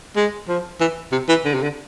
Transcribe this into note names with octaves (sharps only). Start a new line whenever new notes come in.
G#3
F3
E3
C3
E3
D3
C3
D3